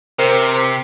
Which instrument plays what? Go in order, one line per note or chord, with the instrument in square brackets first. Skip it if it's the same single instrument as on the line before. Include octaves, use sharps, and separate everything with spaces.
[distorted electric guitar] C3 [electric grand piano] A#4 C5